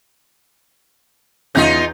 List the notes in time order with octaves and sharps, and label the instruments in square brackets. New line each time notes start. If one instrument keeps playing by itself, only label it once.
[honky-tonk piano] E2 G6 A#6 [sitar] C#4 D#4 F4